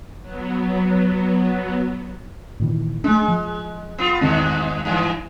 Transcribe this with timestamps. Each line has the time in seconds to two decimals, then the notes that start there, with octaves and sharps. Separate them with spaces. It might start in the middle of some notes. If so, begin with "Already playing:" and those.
0.21 F#3 B3
2.60 A#2 D#3 E3
3.04 G#3 A3 D4
3.28 F3
3.98 B3 F4
4.21 E2 G2 B2 D#3 C4
4.85 G2 E3